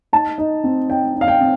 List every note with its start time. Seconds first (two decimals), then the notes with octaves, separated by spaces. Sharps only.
0.13 D#4 A5
0.38 D#4
0.64 C4
0.89 D#4 G5
1.15 D#4
1.21 F5
1.28 G5
1.41 C4